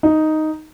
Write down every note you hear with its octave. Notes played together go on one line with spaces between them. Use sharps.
D#4